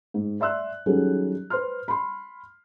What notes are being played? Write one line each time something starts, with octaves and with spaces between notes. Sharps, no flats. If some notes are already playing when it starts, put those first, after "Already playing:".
G#2
D5 E5 C6 E6 F#6
D#3 F#3 G3 C#4 G#4 A4
B4 C5 C6 F6
B5 C6